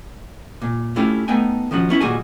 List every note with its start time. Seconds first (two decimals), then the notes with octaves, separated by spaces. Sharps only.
0.62 A#2
0.96 A3 C#4 E4 F4 G4
1.28 A3 B3 D#4 G5 G#5
1.71 D#3 F3 C#4 F#4
1.89 B3 C#4 E4 E5
2.00 D#2 A#2 G3 F#4 G#4 G#5